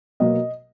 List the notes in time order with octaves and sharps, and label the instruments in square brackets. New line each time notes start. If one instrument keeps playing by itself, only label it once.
[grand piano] B2 F#3 A#3 D#5